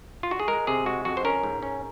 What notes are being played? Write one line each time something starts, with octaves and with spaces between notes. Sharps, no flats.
F4
F#4
G#4
G#3 A#4
C3 G#4
G#3 F#4
F2 F#4
C5
C#4 A#4
G#2
C#4